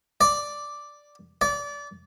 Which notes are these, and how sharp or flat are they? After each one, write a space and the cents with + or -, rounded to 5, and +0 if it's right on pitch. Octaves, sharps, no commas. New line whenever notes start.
D5 +0
D5 -25